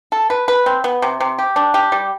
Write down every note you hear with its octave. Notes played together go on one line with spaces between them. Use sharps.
A4
B4
B4
C4
B3
C3
C3
G4
D4
G4
G3